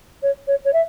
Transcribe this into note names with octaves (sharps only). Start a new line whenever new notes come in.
C#5
C#5
C#5
E5